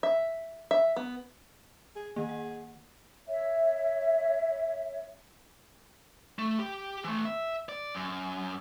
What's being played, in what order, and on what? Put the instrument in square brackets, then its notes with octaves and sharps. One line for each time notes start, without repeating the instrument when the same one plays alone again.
[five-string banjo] E5
E5
B3
[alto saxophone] G#4
[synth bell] D#3 A#3 [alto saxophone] G#4
[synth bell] F#5
[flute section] C#5 E5
[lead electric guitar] A3
G4
E3 A3
E5
D5
F#2